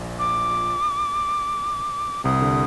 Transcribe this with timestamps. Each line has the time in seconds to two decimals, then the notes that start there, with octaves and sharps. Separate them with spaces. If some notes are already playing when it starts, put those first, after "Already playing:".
Already playing: A#1 A#2
0.19 D6
2.24 C2 C3 D#6
2.42 D3